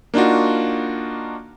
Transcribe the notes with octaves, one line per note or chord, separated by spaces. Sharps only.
A#3 D4 D#4 F4 F#4